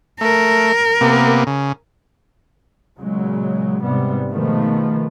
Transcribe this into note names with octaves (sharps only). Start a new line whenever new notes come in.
A3 A#4
C3 A#3 B3
C#3
A#2 C#3 F#3 G#3
G#2 C3 G3 B3
B2 D#3 F3 G#3 A3 B3